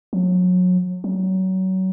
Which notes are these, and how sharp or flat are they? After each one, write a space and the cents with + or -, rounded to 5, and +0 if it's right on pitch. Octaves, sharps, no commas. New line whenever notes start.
F#3 -30
F#3 +25